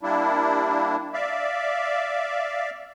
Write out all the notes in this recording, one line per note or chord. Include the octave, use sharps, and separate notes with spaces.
G3 A#3 D4 E4
D5 E5 F5